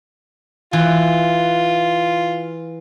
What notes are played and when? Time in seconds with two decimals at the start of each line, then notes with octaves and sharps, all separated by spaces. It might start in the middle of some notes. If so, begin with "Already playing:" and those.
0.73 E3 F4